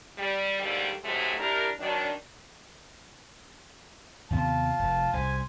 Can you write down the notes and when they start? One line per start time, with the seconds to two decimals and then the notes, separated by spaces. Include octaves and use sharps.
0.18 G3
0.60 D#2 G#2 D3 G3
1.04 G#2 C3 F#3 G#3 A3
1.38 D4 E4 G4 A#4
1.80 D#3 F#3 D4
4.30 D#2 C3 B3 F4 A5
4.79 F1
5.13 C2 C3 C5 G#5